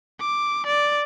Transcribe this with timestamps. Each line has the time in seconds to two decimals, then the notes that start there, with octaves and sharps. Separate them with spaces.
0.20 D6
0.66 D5